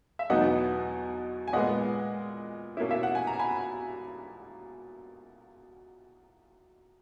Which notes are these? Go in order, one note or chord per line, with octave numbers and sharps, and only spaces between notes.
E5
E2 B2 F#3 B3 D#4 D#5 F#5
G#5
A#2 G#3 B3 D#5 F#5
B2 A#3 C#4 E4
E5
F#5
G#5
A#5
G#5 B5